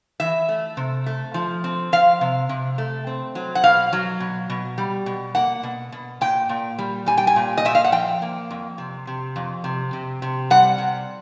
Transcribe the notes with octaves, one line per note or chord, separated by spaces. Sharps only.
E3 E5
A3
C3
A3
F3
C4
F3 F5
C3
C3
A3
C4
F#3
F#5
B2 F5
F#3
B2
B2
G3
B2
A#3 F#5
B2
B2
A#2 G5
A#2
G3
G3 G#5
G5
G#5
A#2
D#5
A#2 E5
F5
F#5
F3 G5
A#3
F2
C3
C3
F2
C3
C3
C3
G3 F#5
C3